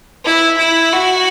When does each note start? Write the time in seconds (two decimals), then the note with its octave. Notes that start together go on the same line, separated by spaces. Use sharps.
0.25 E4
0.58 E4
0.92 F#4